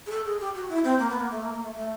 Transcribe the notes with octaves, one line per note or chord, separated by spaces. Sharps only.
G#4
A4
G#4
G4
F#4
E4
C4
A#3
B3
A#3
A3
A#3
A#3
A3
A3